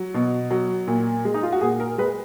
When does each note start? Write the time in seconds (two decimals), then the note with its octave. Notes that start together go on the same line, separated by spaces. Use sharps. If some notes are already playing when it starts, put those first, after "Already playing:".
Already playing: F#3
0.14 B2
0.51 F#3
0.88 A#2
1.25 G#3
1.34 D#4
1.43 F4
1.52 F#4
1.61 A#2 G#4
1.80 A#4
1.98 G#3 B4